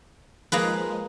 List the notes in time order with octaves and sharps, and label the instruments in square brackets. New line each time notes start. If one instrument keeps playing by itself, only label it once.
[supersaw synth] F3 G#3 [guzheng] A#3 G#4 B4